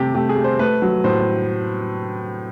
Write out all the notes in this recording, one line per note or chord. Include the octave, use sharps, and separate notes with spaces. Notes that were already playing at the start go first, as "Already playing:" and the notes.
Already playing: C3 A3 G4
A3 G4
G#4
A3
C5
A3 B4
F#3
A2 C5